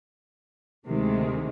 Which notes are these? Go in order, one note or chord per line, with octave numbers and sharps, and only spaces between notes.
D2 C3 D#3 G#3